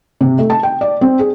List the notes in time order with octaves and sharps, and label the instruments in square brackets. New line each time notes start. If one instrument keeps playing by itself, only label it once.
[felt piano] C3
A3
A5
G5
D5
C4
G#4